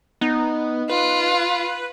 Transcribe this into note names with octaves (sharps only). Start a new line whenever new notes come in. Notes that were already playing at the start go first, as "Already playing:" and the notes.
B3 D#4
F4 B4